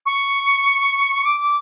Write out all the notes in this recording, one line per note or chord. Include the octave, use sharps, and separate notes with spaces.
C#6
D6
D6